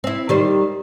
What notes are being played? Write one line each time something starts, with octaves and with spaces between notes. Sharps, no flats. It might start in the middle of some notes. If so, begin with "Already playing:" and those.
C4 E4
D#3 G3 C5